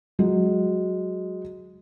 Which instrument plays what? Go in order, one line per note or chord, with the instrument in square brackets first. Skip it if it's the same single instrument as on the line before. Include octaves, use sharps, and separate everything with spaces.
[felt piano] F#3 G#3